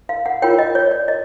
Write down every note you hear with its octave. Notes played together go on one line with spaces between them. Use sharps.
F5
F#5
F4 A#4 C#5 G5
D#5
C#5
D5
D#5